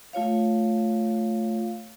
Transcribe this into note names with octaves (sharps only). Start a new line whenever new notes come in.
A3 F4 C#5 F5